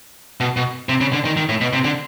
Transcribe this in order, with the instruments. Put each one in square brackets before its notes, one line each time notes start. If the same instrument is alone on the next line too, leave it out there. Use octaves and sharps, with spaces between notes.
[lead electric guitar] B2
B2
C3
C#3
D3
D#3
D#3
A2
B2
C3
D3